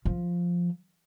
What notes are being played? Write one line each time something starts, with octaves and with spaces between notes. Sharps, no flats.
F3